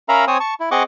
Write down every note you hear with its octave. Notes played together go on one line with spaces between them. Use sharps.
C#4 A#4 E5 F5 A#5 B5
C4 C5 C#5 G#5 D#6
A5 C#6
E4
C4 G#4 D#5 F#5 C#6 D6